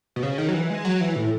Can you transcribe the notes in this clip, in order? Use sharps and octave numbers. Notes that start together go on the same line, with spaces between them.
B2
C#3
D#3
F#3
E3
G#3
F#3
E3
A2